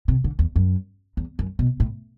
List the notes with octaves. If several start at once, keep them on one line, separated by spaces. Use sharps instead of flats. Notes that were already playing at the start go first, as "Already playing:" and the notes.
C3
D3
E2
F#2
E2
F#2
B2
A2